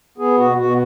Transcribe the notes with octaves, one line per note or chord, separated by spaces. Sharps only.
B3 G#4
B2 F#4
B2 F#4